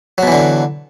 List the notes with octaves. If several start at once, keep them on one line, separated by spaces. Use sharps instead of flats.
B2 D3 E3 F#3